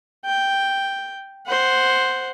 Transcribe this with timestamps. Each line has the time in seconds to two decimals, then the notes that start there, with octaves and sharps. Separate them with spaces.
0.25 G5
1.47 C5 F#5